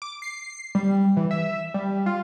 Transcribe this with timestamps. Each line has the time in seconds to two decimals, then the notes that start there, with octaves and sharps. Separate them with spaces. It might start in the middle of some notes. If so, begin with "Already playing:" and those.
0.02 D6
0.22 C7
0.75 G3
1.17 E3
1.31 E5
1.74 G3
2.06 F4